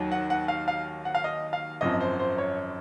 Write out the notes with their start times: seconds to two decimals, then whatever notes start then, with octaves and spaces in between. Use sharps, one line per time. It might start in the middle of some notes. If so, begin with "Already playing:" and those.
Already playing: D#2 D#3 F#3
0.12 F#5
0.30 F#5
0.48 F5
0.68 F5
1.05 F#5
1.15 F5
1.24 D#5
1.53 F5
1.81 G#1 F#2 F3 D#5
2.00 C5
2.19 C5
2.38 C#5